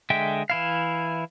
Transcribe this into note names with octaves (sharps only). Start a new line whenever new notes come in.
D3 G#3 E5 G5
E3 E4 F5